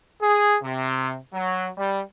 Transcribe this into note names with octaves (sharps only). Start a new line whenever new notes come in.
G#4
C3
F#3
G3